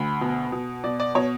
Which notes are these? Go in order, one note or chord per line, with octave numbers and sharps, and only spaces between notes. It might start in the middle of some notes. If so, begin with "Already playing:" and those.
Already playing: D2 B5
B2
B2
B2 D5
D5
B2 C#5